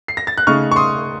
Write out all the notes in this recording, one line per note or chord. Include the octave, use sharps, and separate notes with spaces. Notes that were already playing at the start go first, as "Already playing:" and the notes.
C7
A#6
A6
F#6
C#3 A3 D#4 C#6 F6
C#6
C6 D#6